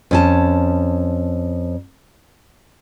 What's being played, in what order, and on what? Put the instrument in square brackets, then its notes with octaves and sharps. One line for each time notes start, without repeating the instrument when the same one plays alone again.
[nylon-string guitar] F2 C#4 A5